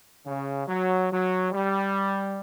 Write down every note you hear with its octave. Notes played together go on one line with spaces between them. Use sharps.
C#3
F#3
F#3
G3